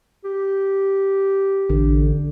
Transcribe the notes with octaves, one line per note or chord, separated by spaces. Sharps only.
G4
A1 D3